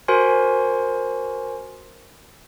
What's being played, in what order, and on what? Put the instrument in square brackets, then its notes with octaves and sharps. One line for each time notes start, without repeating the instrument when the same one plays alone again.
[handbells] F#4 A#4 C5 G#5 C6